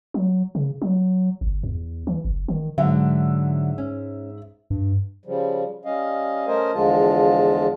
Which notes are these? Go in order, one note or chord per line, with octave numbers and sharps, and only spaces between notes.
F#3
C#3
F#3
G1
E2
E3
F#1
D#3
G#2 D3 F#3 F#4 E5
C#4
G2
C#3 F3 G3
G3 C#4 D#5 F5
A3 C#4 A#4 C5 D#5 G#5
E2 D3 F3 G#3 F4 A5